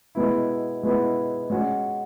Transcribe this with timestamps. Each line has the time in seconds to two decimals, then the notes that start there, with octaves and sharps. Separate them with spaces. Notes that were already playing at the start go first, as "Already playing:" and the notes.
0.15 B2 G#3 B3 E4
0.83 B2 G#3 B3 E4
1.50 G#3 C#4 F#4